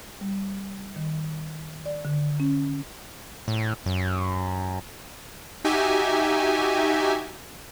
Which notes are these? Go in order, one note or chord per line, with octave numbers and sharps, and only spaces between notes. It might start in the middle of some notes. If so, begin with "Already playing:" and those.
G3
D#3
D5
D3
C#4
A2
F#2
D#4 F#4 G4 E5 G#5